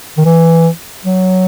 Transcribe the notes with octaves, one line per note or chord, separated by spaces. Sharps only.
D#3
E3
F#3